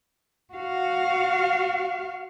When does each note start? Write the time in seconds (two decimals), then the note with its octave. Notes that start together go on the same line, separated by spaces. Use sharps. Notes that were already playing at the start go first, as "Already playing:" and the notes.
0.54 F#4 F5